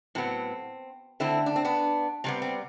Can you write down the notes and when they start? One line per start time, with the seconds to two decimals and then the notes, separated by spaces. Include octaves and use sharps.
0.15 A2 F#3 B3 C4
1.20 D3 A3 C4 E4
1.46 D4
1.56 C4
1.65 B3 D4
2.24 C3 G3 B3 C4
2.42 C4